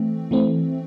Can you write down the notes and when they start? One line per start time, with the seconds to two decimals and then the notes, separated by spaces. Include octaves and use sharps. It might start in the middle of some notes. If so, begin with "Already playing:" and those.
Already playing: E3 A3 C4
0.31 E3 A3 C4